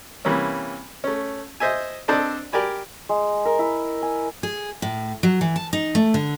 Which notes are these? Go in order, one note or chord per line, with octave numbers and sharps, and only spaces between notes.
C3 E3 G3 A#3 C#4
A3 C#4
C5 D#5 E5 G#5
C4 D4 A4 C5 D5 D#5
G4 A#4 D5 G#5 B5
G#3
A#4
E4
G#5
G#4
A2
F#3
E3
A5
D#4
A3
D3